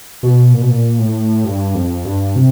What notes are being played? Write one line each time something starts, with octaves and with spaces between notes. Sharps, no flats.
B2
A#2
B2
A#2
A2
G2
F2
G2
C3